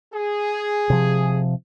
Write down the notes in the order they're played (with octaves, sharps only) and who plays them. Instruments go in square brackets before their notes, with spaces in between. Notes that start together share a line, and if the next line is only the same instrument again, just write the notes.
[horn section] G#4
[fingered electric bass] C3 F3